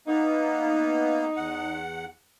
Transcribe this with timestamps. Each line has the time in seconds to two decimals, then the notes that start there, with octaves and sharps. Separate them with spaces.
0.07 A#3 B3 D#4
1.36 E2 F#5